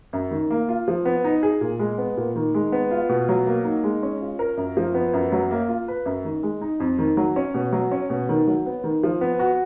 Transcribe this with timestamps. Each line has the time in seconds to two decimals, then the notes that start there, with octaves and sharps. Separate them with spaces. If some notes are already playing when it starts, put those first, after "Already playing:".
0.13 F#2
0.31 D#3
0.50 A#3
0.69 F4
0.88 F3
1.05 B3
1.24 D#4
1.43 G#4
1.61 A#2
1.79 G#3
1.98 B3
2.17 A#2
2.36 D#3
2.55 G#3
2.72 B3
2.91 F4
3.09 B2
3.29 F#3
3.47 A#3
3.65 D#4
3.84 G#3
4.03 C#4
4.21 F4
4.39 A#4
4.57 F#2
4.77 F3
4.94 B3
5.14 F#2
5.32 F#3
5.51 A#3
5.69 F4
5.88 B4
6.06 F#2
6.25 D#3
6.43 G#3
6.61 D#4
6.80 F2
6.99 D#3
7.17 F#3
7.36 C#4
7.54 B2
7.72 F#3
7.91 C#4
8.10 B2
8.29 D#3
8.47 F#3
8.66 B3
8.84 D#3
9.03 F3
9.21 B3
9.39 F#4